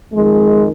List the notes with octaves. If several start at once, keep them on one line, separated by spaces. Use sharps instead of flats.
F2 D#3 G#3